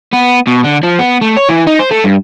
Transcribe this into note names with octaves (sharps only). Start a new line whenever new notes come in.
B3
B2
D3
F3
B3
A3
C#5
E3
D#4
C5
A3
G2